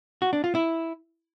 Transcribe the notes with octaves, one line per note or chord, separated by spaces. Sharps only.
F#4
D4
F4
E4